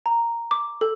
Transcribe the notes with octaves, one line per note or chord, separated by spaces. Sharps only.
A#5
D6
A4